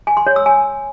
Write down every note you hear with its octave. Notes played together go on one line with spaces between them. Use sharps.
G#5
C6
C#5
E6
G#5